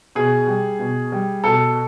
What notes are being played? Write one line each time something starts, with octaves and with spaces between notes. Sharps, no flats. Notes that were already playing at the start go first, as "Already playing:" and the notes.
B2 G#4
G3
B2
G3
B2 A4